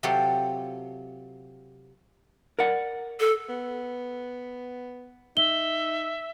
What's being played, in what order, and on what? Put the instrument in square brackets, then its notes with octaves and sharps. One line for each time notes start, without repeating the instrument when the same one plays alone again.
[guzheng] C3 F#3 F4 G4 A4 C5
[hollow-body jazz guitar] A#4 D5 F#5
[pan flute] A4
[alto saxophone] B3
[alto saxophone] D#4 [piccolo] E5 [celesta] G7